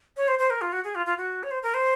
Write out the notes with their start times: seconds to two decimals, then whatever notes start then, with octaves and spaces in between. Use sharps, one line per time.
0.17 C#5
0.28 C5
0.39 C5
0.50 A#4
0.61 F4
0.73 F#4
0.84 G#4
0.95 F4
1.06 F4
1.18 F#4
1.43 C#5
1.51 C5
1.63 A#4
1.74 C5